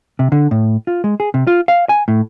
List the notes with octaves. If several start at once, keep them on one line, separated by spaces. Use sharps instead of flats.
C3
D3
A2
F4
G#3
G#4
C3
F4
F5
G#5
A2